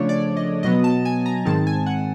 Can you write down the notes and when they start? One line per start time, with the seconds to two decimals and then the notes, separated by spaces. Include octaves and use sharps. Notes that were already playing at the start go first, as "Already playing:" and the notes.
Already playing: C#3 F3 A3 D4 C#5
0.09 D5
0.37 D#5
0.63 B2 F#3 B3 D#5
0.84 A5
1.05 G#5
1.26 A#5
1.45 G#2 D#3 G#3 C4 A5
1.67 G#5
1.86 F#5